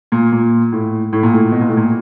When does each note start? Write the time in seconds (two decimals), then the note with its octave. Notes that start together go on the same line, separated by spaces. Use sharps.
0.12 A#2
0.32 A#2
0.72 A2
1.13 A2
1.23 A#2
1.33 A2
1.52 B2
1.61 A#2
1.69 A2
1.77 A#2